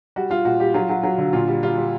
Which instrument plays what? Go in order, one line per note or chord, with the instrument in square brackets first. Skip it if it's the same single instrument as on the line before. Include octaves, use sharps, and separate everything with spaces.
[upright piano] G3 F#4
G3 F4
A#2 F#4
G3 G4
F#3 F4
F#3
F#3
D3
A#2 F4
G3
G3 F4
G3